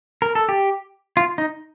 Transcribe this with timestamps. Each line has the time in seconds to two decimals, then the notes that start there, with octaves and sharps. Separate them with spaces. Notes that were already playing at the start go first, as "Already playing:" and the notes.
0.22 A#4
0.35 A4
0.49 G4
1.17 F4
1.38 D#4